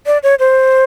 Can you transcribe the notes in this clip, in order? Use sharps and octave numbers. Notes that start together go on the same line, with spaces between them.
D5
C#5
C5